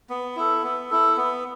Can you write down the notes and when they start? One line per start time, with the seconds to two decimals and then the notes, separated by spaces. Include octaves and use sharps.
0.10 B3
0.36 E4 A4
0.63 B3
0.90 E4 A4
1.17 B3